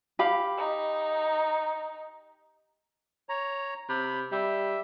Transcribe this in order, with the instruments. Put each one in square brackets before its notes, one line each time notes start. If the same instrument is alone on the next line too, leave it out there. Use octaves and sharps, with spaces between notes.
[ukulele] G4 F5 B5
[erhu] D#4
[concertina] C#5 A#5
[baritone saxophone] C3 [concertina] B5
[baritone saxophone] G3 [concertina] E5